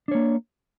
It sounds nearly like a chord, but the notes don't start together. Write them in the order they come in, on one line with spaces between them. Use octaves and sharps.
D4 C#5 A#3